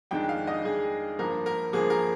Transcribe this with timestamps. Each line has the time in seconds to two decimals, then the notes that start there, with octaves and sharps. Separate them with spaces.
0.11 F2 D#3 G#3 D4 G5
0.29 F5
0.47 D#5
0.65 F2 D#3 G#3 D4 G#4
1.19 G2 F3 A#3 A#4
1.46 A#4
1.73 G2 F3 A#3 G#4
1.90 A#4